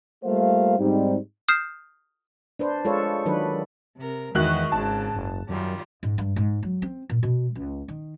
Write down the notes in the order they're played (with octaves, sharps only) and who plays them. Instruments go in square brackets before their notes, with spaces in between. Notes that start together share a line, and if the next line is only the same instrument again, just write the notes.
[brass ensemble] G3 A3 A#3 F4 C5 F5
G#2 G3 C4 D#4
[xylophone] D#6 F6 G6 C7 E7
[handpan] D4 B4 C5
G#3 F4 A4 B4 C#5
D#3 F#3 D4 B4
[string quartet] C3 A#4
[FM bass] E2 [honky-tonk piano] D#3 F#4 F#6 [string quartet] G#3 E4 D#5
[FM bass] G#1 [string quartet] G#2 C#3 [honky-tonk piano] A5
[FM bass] F#1
[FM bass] F#2 [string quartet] D#3 G3 F4
[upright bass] G#2
G2
G#2
F#3
C4
A#2
B2
C#2
D#3